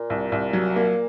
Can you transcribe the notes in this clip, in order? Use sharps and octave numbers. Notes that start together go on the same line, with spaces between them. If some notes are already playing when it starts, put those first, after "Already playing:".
Already playing: A#2
C2
C2
F#3
A#3